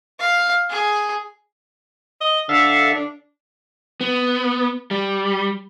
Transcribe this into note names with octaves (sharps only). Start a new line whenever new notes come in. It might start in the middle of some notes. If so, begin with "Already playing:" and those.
F5
G#4
D#5
D3 A4 E5 F5
D4
B3
G3